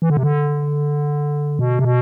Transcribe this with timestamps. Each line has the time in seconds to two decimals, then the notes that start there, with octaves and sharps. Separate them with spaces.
0.02 E3
0.10 D3
0.17 C3
0.23 D3
1.59 B2
1.79 C3
1.85 B2